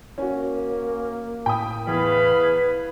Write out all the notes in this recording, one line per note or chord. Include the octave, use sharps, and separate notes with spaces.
A#3 C#4 F#4
A2 G5 B5 D#6
E2 G#4 B4 F5 B5